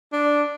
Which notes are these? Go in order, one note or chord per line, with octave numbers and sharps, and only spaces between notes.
D4